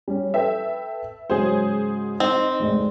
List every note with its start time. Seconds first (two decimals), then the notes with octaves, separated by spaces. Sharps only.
0.08 G3 C#4
0.34 A4 B4 E5 G5
1.30 G#2 C#3 F#3 G#4 C5
2.20 C4 D#4
2.60 F1 D2 G#2